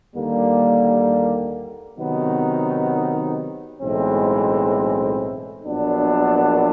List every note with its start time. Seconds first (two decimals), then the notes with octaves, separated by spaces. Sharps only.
0.15 D#2 D3 G3 A#3
1.98 C3 D#3 F#3 B3 D#4
3.82 B1 A2 E3 G#3 C4
5.64 A#1 A#2 F#3 B3 D4